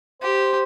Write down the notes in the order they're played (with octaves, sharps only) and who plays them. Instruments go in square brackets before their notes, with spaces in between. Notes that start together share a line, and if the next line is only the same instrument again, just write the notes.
[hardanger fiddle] G4 [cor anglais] C5